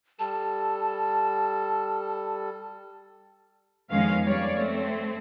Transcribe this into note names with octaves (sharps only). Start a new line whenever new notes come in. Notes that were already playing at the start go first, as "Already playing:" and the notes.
G3 A4 A5
F2 D#3 G#3 B3 C#4 F5
G3 C#5 D5
A3 C4